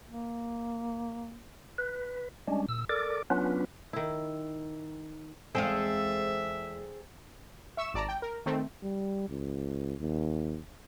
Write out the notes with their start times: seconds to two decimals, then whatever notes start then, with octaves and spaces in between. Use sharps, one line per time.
0.10 A#3
1.78 B4
2.48 G3 G#3 C#4 D4
2.69 A#2 E6
2.89 A4 A#4 D5 D6
3.30 F#3 B3 C#4 D4 F4 B4
3.93 D#3 E4
5.55 E2 G#3 C4 G#4 A4 E5 F5
7.77 E5 C#6 E6 E7
7.94 G#1 D5 A5 A#5
8.08 G5
8.22 A#4
8.46 D#3 A3 C4
8.83 G3
9.29 C#2
10.00 D#2